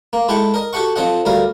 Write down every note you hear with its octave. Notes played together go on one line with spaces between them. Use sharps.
A#3
G#3 E4 A4 F#5 G5
A#4 D#5
F#4 G4 A4 F#5 C#6
F3 C4 A4 D#5 F#5
D2 G3 A#4 F5